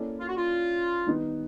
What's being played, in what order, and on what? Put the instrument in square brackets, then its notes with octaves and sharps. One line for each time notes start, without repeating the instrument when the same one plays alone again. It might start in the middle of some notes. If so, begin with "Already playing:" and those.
Already playing: [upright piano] A#3 C#4 E4 A4 D5
[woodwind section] F4
F#4
F4
[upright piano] D#3 G3 B3 D#4